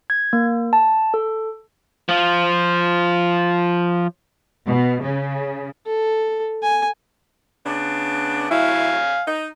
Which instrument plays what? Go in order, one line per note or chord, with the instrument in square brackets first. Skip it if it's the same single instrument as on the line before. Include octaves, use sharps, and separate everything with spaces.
[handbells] G#6
A#3
A5
A4
[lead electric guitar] F3 F4
[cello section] B2
C#3
[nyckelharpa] A4
G#5
[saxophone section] C#3 B3 D4
[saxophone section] F#3 A3 E4 [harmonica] F5 G#5
[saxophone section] D#4